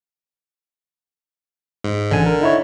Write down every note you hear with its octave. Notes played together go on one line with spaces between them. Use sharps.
G#2
A1 D3 G#5
A#4
D#4 E4 C#5